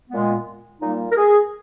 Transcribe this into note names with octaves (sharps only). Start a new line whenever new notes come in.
A#2 G#3 B3
A#2 G3 A#3 D#4
A#4
G#4